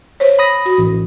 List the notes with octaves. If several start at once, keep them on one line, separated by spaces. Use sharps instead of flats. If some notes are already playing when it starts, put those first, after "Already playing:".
C5 C#5
B5 D#6 A#6
F#4
A1